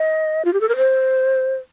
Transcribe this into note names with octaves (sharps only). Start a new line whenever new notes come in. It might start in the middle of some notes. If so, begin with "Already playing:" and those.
Already playing: D#5
F4
G4
A4
A#4
C5